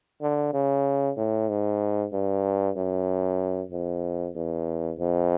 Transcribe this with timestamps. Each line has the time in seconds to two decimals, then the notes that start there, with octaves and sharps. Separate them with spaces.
0.22 D3
0.54 C#3
1.17 A2
1.49 G#2
2.13 G2
2.77 F#2
3.72 F2
4.36 E2
4.99 F2